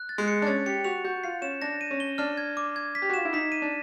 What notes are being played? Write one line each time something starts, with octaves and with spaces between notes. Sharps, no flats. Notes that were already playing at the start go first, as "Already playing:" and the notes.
Already playing: F#6
A6
G#3
C#7
D4
C#4 A6
G4 C#7
F#4 F7
F#4 G6
F4 C7
C#4 E7
D4 A#6
D#7
C#4
G7
D4 F6
G#6
D6
G#6
B6
G4
F#4
F4 E7
E4
D#4 B6
D#7
D4